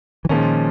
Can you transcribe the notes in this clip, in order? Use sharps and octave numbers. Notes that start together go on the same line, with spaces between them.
E3
A#2 D#3 F3 G#3 C#4